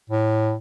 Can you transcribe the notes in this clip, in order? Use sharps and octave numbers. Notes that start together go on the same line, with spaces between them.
A2